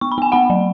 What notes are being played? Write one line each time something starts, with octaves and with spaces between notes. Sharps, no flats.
B3 C#6
B5
B3 G#5
B3 F#5 B5
F#3